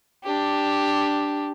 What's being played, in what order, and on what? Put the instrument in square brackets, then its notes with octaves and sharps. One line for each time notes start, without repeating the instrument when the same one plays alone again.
[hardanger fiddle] D4 G4